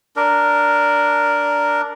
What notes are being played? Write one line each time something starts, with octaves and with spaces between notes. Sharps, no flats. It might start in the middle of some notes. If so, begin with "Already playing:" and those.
D4 A#4